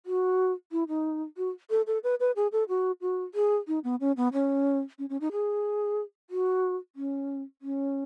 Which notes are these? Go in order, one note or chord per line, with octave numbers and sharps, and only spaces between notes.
F#4
E4
D#4
F#4
A4
A4
B4
B4
G#4
A4
F#4
F#4
G#4
D#4
B3
C#4
B3
C#4
C#4
C#4
D#4
G#4
F#4
C#4
C#4